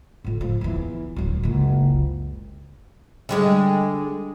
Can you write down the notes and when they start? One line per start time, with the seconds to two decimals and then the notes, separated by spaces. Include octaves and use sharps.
0.24 A2 F3
0.41 F3
0.61 E2 E3
1.16 D1 F#3
1.43 F#1 C#2
3.29 D3 G3 G#3